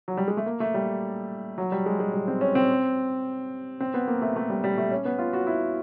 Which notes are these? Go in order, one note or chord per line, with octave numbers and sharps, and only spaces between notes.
F#3
G3
G#3
A3
A#3
A3
G3
F#3
G3
G#3
G#3
G3
C4
C#4
C4
C4
B3
A#3
A3
A3
G3
G3
A3
C#4
B3
F4
F#4
E4